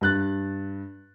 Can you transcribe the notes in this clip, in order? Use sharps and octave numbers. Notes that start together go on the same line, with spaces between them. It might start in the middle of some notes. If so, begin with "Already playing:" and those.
G2 F#6 A6